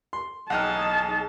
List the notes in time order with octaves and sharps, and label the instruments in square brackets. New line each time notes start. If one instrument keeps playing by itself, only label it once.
[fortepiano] C6
[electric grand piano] B1 D#5 F6 [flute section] D#4 G#4 [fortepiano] F#5 G5 [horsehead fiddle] A5